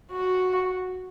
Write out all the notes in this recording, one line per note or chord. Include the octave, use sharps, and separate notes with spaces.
F#4